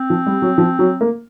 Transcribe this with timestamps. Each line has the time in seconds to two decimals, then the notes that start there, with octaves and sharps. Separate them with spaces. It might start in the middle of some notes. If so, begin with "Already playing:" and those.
Already playing: C4
0.10 F3
0.26 G3
0.42 F#3
0.58 F3
0.79 F#3
1.01 A#3